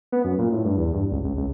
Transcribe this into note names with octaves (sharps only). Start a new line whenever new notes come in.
B3
F#2
A#2
A2
G2
E2
G2
C#2
C#2
C#2